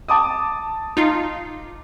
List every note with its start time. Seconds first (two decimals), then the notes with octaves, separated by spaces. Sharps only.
0.08 A5 D6 D#6
0.97 D#4 F4 F5